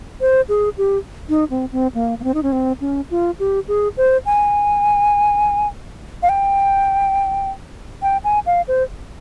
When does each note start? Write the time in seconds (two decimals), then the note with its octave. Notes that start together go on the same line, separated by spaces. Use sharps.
0.21 C5
0.49 G#4
0.78 G4
1.29 D#4
1.50 C4
1.72 C4
1.94 A#3
2.20 A#3
2.24 C4
2.34 D#4
2.43 C#4
2.52 C4
2.81 C#4
3.11 F4
3.39 G4
3.68 G#4
3.97 C5
4.26 G#5
6.23 F5
6.29 G5
8.02 G5
8.24 G#5
8.46 F5
8.68 C5